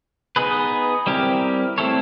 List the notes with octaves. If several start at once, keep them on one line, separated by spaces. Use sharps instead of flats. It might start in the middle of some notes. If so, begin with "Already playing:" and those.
B3 D#4 G#4 B4
G3 C4 E4 G4 A#4
A3 C4 E4 A4 C#5